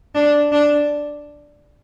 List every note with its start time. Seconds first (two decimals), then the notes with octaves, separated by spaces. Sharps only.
0.15 D4
0.52 D4